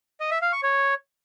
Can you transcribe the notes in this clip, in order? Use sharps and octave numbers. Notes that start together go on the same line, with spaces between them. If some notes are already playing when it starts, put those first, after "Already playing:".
D#5
E5
F5
C#6
C#5